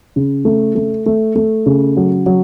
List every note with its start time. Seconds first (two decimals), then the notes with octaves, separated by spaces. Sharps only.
0.16 C#3
0.45 A3
0.75 A3
1.06 A3
1.36 A3
1.66 C#3
1.97 F#3
2.26 F#3